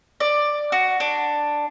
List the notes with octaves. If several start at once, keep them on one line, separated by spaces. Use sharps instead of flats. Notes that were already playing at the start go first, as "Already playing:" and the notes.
D5
F#4
D4